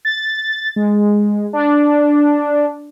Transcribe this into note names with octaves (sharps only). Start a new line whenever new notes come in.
A6
G#3
D4